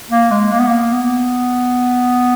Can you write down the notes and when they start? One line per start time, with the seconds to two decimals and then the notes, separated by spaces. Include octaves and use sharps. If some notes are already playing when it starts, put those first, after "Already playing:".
0.10 A#3
0.31 G#3
0.52 A#3
0.59 B3
0.67 A#3
0.93 B3